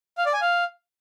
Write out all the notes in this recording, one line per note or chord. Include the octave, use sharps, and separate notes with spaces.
F5
D5
G#5
F5